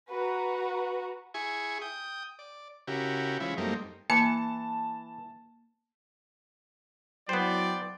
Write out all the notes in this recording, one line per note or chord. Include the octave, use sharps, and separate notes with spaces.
F#4 B4 A#5
E4 G#4 G#5 C#6
G5 D#6
D5
C#3 E4 F#4 G4 A#4
E3 F3 G#3 C#4 E4
F#2 G3 A3 A#3 C4 D#4
E3 A#3 A5 C#7
F#3 B3 E4 C5 D5 G5